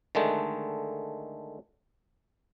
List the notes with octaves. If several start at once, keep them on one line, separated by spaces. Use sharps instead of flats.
D3 D#3 G#3 A3